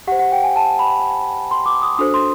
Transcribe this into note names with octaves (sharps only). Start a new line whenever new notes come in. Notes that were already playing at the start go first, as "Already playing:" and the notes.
G4 C5 F#5
F#5
G5
G#5
A5
B5
C6
D6
D#6
D4 F#4 A4 C5 D#6
C6